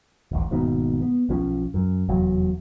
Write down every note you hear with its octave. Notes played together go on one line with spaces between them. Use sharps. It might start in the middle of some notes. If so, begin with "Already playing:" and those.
D1 A1
D#1 D#2 G#2 B2
B3
B1 F3 C#4
F#2
F1 E2 F#3